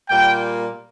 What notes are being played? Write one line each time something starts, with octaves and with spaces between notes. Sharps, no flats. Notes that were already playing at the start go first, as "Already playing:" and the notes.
A#2 G3 A#3 G5